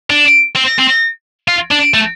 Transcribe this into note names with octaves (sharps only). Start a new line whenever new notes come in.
D4
C4
C4
F4
D4
A3